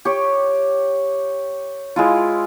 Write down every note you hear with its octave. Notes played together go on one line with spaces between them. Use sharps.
G4 C#5
G#3 E4 F4